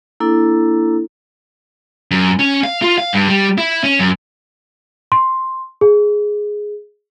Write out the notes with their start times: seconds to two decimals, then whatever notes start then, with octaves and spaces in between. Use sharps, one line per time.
0.20 A#3 D4 E4 A4
2.11 F#2
2.39 C#4
2.64 F5
2.82 F4
2.98 F5
3.13 G2
3.28 G3
3.58 E4
3.84 C#4
3.99 F#2
5.12 C6
5.81 G#4